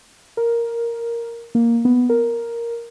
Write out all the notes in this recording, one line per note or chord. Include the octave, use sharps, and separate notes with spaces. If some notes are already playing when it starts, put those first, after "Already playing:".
A#4
A#3
B3
A#4